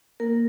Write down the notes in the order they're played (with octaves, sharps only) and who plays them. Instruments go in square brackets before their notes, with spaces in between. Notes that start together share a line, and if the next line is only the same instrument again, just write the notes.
[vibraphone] A#3 A#4